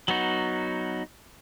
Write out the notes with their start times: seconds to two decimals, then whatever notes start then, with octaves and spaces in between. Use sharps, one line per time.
0.08 F#3 B3 D#4 F#4